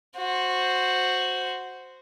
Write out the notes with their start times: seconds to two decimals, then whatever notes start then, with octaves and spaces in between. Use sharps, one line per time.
0.17 F#4 C5